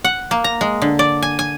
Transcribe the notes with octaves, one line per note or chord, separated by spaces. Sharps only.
F#5
A#3
A#5
G#3
D3
D5
G#5
G#5